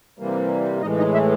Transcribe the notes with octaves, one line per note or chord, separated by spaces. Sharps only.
C3 E3 G3 A#3
A2 E3 G#3 D#4 D#5
D#4 D#5
E4 E5